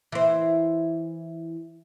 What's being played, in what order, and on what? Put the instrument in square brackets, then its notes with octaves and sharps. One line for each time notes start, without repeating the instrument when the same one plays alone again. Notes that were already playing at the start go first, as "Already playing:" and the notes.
[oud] E3 C5